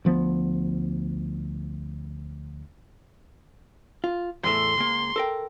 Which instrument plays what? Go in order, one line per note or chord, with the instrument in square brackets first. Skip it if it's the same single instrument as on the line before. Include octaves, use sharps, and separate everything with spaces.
[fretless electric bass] D2 F3 B3
[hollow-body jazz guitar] F4
[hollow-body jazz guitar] E2 A2 A3 [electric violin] C6
[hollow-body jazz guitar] C#2 A#3
A4 A#4 G5